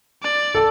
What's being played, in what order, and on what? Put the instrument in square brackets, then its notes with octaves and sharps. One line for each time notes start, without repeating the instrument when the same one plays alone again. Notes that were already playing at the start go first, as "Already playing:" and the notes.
[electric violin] D5
[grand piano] A4